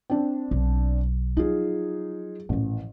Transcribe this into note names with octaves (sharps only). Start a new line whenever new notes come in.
C4 D4
B1
F3 F#3 D#4 F4 G#4
A1 A#2 F3